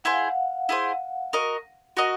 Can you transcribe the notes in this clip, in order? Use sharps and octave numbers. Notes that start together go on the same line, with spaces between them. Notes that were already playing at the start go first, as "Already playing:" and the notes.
E4 G#4 C5 F#5
F5
F#5
E4 G#4 C5
F#4 A#4 D#5
F#4 A#4 D#5 F#5